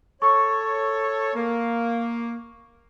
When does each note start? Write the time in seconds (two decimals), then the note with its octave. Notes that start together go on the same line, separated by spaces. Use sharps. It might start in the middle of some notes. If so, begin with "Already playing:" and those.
0.22 A4 C#5 C#6
1.35 A#3